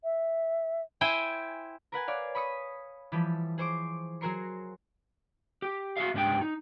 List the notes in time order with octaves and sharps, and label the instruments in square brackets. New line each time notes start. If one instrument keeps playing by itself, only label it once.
[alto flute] E5
[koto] E4 C5 G5 G#5
[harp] A#4 B4 F#5 G#5
C#5 D5 F5
B5 C#6 D#6 B6 C#7
E3 F3 G3 G4 A4
G#4 C5 C#6 D6
F#3 F#4 G#4 A#4 C6 C#7
[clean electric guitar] G4
F#4 E5 F5
C#2 G#2 D4 G4 G5
D#4